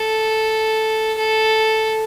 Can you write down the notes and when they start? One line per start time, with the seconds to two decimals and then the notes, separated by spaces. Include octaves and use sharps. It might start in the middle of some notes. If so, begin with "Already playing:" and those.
Already playing: A4
1.18 A4